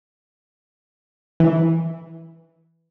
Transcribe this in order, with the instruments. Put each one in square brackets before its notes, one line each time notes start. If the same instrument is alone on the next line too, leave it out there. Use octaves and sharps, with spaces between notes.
[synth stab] E3